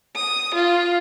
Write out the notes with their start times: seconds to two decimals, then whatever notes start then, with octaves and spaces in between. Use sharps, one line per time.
0.16 D#6
0.54 F4